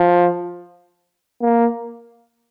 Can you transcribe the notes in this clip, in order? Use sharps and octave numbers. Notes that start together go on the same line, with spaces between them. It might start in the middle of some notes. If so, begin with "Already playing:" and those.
Already playing: F3
A#3